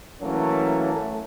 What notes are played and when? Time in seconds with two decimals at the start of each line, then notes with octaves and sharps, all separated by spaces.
0.21 E3 F#3 A3 A#3 C#4
0.93 A3